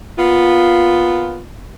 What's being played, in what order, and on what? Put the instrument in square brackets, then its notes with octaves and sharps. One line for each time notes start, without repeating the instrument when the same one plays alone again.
[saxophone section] A#2 B3 F4